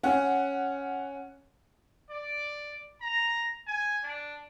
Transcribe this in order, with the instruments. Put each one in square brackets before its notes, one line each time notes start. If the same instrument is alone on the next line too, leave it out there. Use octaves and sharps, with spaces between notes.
[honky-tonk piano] C#4 F#5
[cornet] D5
A#5
G#5
D4